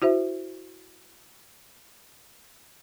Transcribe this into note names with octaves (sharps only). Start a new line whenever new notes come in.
E4 F#4 C5 E5